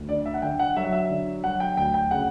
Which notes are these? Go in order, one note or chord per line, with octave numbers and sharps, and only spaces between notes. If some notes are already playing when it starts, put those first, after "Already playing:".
Already playing: D2
D3 D5
E5
F#5
D3 G5
F#5
F#3 E5
F#5
E5
D3
F#3 F#5
G5
D2 G5
G5
C#3 F#5